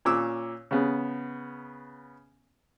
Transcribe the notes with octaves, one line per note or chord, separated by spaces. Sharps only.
A#2 C#4 C#5 D6 E6
C#3 B3